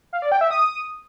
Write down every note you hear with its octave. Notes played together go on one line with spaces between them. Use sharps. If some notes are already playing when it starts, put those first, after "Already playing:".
F5
D5
G5
E5
D#6